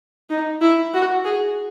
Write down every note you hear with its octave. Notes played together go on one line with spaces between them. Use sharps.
D#4
E4
F#4
G#4